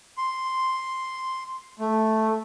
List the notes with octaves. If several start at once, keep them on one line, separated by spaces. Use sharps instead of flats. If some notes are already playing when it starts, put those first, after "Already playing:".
C6
A3